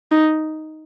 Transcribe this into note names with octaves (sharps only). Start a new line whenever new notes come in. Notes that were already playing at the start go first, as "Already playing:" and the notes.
D#4